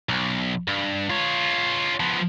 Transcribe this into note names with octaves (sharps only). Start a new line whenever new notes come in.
B1
G2
F4 C#5
F3 B3